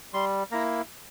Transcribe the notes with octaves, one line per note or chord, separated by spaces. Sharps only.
G3 C6
A#3 E4 A#5